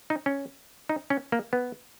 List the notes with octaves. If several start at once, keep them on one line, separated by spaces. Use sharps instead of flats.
D#4
C#4
D#4
C#4
A#3
B3